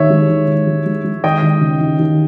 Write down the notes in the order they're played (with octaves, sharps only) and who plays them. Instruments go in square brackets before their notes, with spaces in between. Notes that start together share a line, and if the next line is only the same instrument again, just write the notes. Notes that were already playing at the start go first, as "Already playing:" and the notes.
Already playing: [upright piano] D#2 [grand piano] C#5 E5
[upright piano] G#3
D#2
D#2
G#3
G#3
G#3
[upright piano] D#2 [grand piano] D#5 G5
[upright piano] D#2
C#3
D#2
D#2